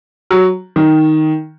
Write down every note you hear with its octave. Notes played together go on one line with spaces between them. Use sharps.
F#3
D#3